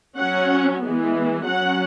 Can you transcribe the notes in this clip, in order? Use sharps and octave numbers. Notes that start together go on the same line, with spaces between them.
F#3 C#4 F#5
E3 G#3 B3
F#3 C#4 F#5